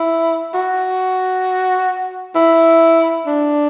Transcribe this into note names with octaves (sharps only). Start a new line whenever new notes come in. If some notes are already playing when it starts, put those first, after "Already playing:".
Already playing: E4
F#4
E4
D4